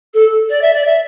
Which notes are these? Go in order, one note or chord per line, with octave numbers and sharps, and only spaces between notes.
A4
D5
E5
D5
E5